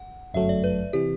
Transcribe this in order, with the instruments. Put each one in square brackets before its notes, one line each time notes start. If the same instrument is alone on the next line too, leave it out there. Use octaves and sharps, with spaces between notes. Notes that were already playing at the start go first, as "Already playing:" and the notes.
Already playing: [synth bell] F#5
[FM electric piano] G1 F#2 F#3 A3 [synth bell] E5
[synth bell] D5
B4
[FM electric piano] C3 E3 [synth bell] G4